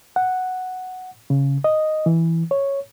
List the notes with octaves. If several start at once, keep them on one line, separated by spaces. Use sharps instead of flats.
F#5
C#3
D#5
E3
C#5